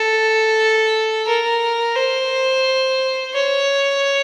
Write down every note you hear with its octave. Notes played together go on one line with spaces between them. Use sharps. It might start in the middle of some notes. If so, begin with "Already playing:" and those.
Already playing: A4
A#4
C5
C#5